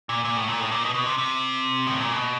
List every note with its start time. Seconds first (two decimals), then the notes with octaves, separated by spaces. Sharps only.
0.09 A#2
0.25 A#2
0.37 A2
0.48 A#2
0.60 A2
0.71 A#2
0.84 B2
0.94 B2
1.06 C3
1.18 C3
1.87 A2
2.00 A#2
2.12 B2